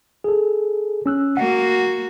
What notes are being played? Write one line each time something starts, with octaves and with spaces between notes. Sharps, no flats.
G#4 A4
C#4 E6 F#6
A#3 F#4 F#5